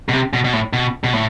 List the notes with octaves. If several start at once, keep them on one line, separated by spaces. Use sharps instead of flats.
B2
C3
B2
B2
A2
B2
B2
A2